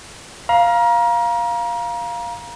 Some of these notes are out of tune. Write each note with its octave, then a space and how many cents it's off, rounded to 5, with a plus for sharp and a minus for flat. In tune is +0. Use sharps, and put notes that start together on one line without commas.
F5 +0 A#5 +30